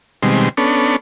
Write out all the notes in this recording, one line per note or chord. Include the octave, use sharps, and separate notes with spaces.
B2 D#3 G3 G#3 C4
B3 C#4 D4 A4